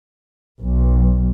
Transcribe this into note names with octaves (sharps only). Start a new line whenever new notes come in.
B1